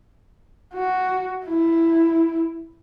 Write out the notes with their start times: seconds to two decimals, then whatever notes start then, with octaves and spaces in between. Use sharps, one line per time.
0.73 F#4
1.45 E4